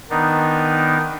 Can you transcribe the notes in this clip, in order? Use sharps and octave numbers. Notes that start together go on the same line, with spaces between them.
D#3 B3 D4 D#4